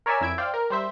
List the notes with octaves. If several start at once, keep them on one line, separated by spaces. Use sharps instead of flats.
A#4 C#5 D5 E5 G#5 E6
F2 E4 E6 G#6 D7
C5 D5 F5 G5
A#4
G3 C5 E5